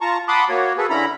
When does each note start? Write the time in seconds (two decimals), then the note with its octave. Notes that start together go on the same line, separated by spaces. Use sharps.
0.01 F4 A5 A#5 C#6
0.28 F#5 A5 B5 C6 D6 D#6
0.49 A#3 F#4 C#5
0.78 F#4 G#4 A4 B4
0.90 D3 C#4 E4 A#5 B5